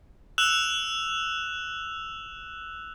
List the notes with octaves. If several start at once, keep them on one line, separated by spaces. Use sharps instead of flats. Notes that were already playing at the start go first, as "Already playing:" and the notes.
E6 F#6 E7 F7